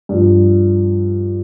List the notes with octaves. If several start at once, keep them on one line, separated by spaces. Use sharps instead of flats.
G2 F3